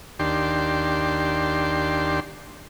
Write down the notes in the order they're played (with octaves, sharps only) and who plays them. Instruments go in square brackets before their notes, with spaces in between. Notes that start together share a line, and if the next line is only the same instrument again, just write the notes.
[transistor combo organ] D#2 D4 G4 C6